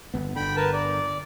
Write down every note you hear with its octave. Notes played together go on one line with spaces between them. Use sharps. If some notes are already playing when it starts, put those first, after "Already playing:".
G1 B3
G1 D3 G5 B5
A#4 B4 A5
D5